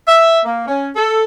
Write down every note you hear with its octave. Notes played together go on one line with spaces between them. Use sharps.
E5
A#3
C#4
A4